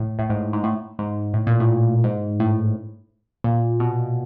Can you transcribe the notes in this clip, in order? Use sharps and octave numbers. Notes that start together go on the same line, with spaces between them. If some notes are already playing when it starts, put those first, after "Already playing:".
Already playing: A2
A2
G#2
G#2
A2
G#2
A2
A#2
A2
G#2
A2
A#2
B2